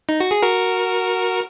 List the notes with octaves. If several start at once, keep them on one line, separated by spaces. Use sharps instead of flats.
D#4
F#4
G#4
F#4 A#4